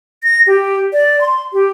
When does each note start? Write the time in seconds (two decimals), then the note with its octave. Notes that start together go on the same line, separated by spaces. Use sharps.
0.23 A#6
0.47 G4
0.93 D5
1.21 C6
1.53 G4